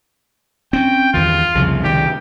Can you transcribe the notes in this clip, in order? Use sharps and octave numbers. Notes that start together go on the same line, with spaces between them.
C4 C#4 G5
E2 G2 D#3 F4
C2 F2 C#3 F3
C2 D#3 G3 G4